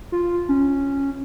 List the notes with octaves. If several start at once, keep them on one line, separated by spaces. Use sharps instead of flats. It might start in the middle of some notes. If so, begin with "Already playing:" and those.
F4
C#4